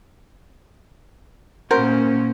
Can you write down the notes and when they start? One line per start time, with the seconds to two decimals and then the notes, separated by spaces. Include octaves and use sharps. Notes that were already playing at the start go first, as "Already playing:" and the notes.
1.71 A#2 C#4 F#4 A#4 C5